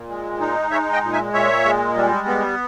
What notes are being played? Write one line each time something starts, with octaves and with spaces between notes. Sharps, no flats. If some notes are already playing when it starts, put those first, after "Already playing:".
Already playing: A#2
G#3
D#4
G#3 C#5 E5
D#5 G5
A#2
E5 G#5
A#2 C#5 E5
G#3
G3
B3